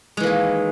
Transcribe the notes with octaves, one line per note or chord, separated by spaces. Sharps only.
D#3 E3 G#3 A#3